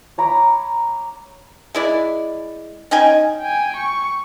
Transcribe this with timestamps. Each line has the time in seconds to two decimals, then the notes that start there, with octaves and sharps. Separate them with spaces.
0.18 C#5 A#5 B5 D6
1.75 G#3 E4 D5
2.91 C#4 D#4 G5 G#5
3.41 G5 G#5
3.76 C#6